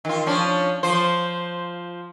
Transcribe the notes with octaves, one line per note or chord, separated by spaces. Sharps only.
D#3 F4
F3 C#4 D4
F3 F4 C5